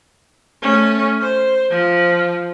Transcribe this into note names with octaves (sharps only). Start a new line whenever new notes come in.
A3 C#4
C5
F3